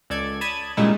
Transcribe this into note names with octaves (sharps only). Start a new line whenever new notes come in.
C#2 A4 D5 G#6
A5 B5 D#6 G#6 D#7
A#2 C#3 G3 G#3 D#4 E4